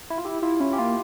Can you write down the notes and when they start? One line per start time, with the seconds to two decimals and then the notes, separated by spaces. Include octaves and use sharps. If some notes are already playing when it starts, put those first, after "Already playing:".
0.10 E4
0.18 F4
0.25 E4 G4
0.42 E4 F4
0.60 C#4 E4
0.73 G4
0.78 A#3 F4